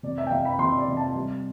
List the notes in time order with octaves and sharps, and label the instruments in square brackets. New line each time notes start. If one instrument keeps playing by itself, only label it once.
[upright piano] C3 D5
E5
G5
C3 F5
B5
C3 C6
D5
C3
A5
G3